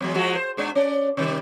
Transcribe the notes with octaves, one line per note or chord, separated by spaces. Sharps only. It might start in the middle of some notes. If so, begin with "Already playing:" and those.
E2 F#3 G#3
F3 G#3 F#4
C5
G#2 G#3 D4
C#4 D5
C3 D#3 G3